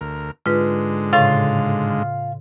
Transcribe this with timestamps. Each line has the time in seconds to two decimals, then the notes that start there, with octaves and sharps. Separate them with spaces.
0.01 D2 A#4
0.46 G#2 D3 G#3 F4 B4
1.13 A2 C#3 F4